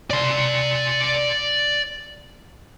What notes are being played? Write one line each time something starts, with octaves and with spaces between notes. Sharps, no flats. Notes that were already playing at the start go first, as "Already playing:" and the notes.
D5 C6